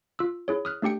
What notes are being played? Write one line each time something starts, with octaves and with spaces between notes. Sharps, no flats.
F4 E6
E4 G#4 C#5
D#6 F6 F#6
A3 D4 G4 G5 C#7